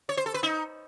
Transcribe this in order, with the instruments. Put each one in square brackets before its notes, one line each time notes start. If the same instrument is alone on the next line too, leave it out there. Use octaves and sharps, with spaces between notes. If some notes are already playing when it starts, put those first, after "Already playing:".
[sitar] C#5
C5
A4
B4
D#4